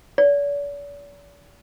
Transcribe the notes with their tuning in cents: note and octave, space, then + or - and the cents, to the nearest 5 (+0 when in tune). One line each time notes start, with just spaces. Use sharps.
D5 -45